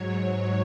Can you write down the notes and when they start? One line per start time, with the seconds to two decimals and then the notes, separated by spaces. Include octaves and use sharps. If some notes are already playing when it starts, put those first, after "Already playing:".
Already playing: G#2 F#3 C#5